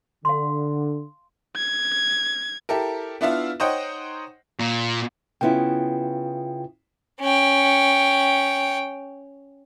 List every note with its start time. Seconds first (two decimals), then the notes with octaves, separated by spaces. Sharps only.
0.25 D3 F5 C6
1.56 G#6
2.69 E4 G4 A4 A#4
3.21 B3 D4 E4 F4 E5 F5
3.60 D#4 C5 C#5 D#5 F#5 G5
4.59 A#2
5.41 C#3 B3 E4 F4 G5
7.21 C#4 G5